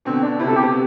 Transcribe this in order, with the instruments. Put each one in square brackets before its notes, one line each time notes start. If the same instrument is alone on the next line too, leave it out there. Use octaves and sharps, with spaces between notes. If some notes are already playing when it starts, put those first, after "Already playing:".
[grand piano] B2 D3 [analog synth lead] C4
[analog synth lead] D4
[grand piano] C3 [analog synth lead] E4
[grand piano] B2 [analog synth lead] A4
[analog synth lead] G4
[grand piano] C3